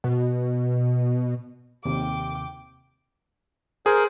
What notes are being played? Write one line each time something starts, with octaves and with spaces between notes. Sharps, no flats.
B2
D#2 C3 G5 D6
G#4 A#4 C5